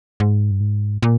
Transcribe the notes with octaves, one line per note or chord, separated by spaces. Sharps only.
G#2
G2
G#2
A#2